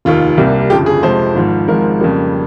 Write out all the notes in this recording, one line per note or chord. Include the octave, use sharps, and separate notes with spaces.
F1 D#2 D#3 A#3 F4
C2 C3 G3 A#3
G1 F2 C#3 F3 G4
G#4
F2 C3 F3 G#3 C5
G#1 G#2 F3
G#1 G#2 F3 G#3 A#4
F2 C#3 G3 A#3